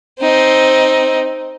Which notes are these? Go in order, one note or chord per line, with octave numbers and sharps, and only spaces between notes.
C4 D#4